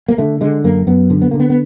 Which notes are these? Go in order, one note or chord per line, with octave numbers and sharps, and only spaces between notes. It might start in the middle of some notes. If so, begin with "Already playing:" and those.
A#3
D3 A3
D3 G#3
F#2 A#3
F#2 B3
D3
B3
D3 A#3
B3
B3